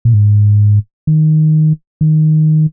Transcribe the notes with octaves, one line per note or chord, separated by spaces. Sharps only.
A#2
G#2
D#3
D#3